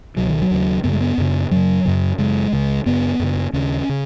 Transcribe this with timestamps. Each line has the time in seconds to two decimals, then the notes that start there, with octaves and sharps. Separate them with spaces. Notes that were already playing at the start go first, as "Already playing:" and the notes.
0.17 C#2 B2 F#3
0.28 D#3
0.42 F#3
0.51 D#2 C#3
0.83 F#2 C#3 B3
0.93 G#3
1.01 B3
1.18 F#2 C#3
1.51 F#2 C#3 F#3
1.85 F#2 C#3
2.18 F#2 C#3 G#3
2.52 C#2 C#3
2.86 F#2 C#3 B3
3.19 F#2 C#3
3.53 D#2 C#3 C#4
3.89 C#3